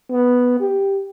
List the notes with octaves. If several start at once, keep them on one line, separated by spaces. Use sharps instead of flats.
B3
G4